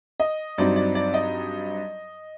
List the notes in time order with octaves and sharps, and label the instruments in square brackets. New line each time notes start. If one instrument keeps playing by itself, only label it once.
[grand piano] D#5
G2 F#3 C4 D#4 D5
D5
D5
D#5